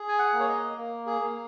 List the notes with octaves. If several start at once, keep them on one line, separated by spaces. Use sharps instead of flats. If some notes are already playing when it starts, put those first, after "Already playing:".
Already playing: G#4
G#5
F#5
A#3
C#5
D#5
A#3
G#4
A#3